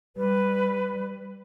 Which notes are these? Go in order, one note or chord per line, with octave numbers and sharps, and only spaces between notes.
G3 B4